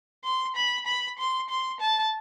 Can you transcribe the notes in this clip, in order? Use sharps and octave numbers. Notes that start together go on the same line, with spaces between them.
C6
B5
B5
C6
C6
A5